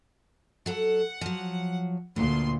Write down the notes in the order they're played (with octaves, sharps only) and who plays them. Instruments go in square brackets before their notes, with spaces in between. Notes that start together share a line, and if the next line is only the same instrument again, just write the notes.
[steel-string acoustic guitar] F#3 A4 [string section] F#5
[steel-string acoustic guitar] F3 F#3
[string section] D2 A#2 C6 [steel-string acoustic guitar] B3